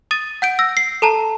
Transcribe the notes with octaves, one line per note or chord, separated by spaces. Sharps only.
D#6 A6 D#7
F#5 G6 D7
E6 A#6
C7
A4 A5 A#5